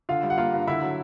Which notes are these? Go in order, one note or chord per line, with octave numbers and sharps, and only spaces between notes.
D3 F4 F5
G3
F#5
A#3 F4 F5
G2
D3 E4 E5
F#3